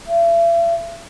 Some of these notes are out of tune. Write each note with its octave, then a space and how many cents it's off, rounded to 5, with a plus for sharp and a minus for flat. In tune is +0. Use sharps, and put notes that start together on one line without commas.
E5 +45